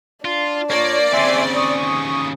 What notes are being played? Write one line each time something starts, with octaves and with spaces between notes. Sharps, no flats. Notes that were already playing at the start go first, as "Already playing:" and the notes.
D4 F4
A#2 A#3 C#5 D5
D#2 C#3 C4 E5 G#5 C6
C#6 D#6